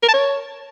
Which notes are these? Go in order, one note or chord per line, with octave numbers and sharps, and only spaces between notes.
A#4
A5
C#5